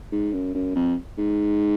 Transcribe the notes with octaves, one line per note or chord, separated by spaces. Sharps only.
G#2
F#2
F#2
F2
G#2